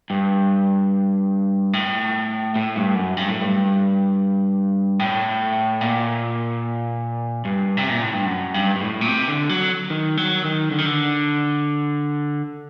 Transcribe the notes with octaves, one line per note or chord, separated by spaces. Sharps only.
G2
A2
A2
G2
F#2
G2
A2
G2
A2
A#2
G2
C3
A#2
A2
G2
F#2
G2
G2
A2
A#2
C3
D3
F#3
D#3
F#3
D#3
D3
D#3
D3